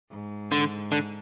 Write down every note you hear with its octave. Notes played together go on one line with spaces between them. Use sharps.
G#2
D3
D3